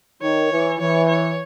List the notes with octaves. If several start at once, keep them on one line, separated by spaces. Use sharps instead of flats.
D#3 C#5
E3
E3 C#5
C#5